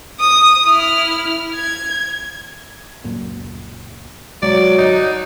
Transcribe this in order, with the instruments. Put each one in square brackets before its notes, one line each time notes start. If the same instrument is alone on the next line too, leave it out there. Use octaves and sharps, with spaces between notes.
[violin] D#6
E4 F6
G#6
[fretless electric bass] C#2 F#2 A#2
[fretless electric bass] B1 B2 G#3 [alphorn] F#3 [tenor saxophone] D5
[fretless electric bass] G1 [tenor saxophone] D#4